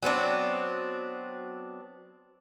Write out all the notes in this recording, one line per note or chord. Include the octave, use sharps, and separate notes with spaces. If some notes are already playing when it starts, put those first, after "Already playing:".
F#3 B3 C4 D4